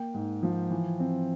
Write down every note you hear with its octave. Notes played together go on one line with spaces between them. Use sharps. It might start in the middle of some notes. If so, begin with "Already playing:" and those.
Already playing: A#3 G5
G#2
F3
E3
C4